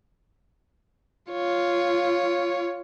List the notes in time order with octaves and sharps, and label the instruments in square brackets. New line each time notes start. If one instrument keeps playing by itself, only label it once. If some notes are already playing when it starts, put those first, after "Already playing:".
[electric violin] F4 C#5